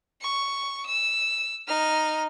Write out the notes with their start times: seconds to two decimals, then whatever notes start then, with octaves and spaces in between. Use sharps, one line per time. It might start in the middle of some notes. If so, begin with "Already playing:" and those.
0.22 C#6
0.86 E6
1.68 D#4 F6